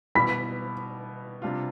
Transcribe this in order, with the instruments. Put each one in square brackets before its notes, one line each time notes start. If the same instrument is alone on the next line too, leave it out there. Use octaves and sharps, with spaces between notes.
[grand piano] B2 G3 B3 E4 [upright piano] B5 B6
[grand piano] C3 G3 D4 F4